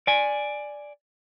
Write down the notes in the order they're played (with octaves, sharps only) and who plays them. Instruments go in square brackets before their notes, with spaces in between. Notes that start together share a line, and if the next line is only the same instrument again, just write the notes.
[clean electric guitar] D5 G#5